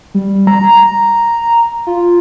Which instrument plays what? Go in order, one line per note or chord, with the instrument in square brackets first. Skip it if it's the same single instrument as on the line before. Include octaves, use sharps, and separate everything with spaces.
[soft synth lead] G3
A#5
F4